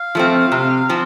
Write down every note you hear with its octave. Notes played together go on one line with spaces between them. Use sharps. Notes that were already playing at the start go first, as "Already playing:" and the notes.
Already playing: F5
F3 A3 C4
C3
F3 C4